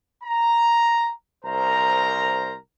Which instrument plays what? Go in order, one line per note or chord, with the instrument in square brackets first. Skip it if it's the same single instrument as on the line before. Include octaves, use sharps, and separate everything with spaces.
[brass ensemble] A#5
C2 A#4 C5 A#5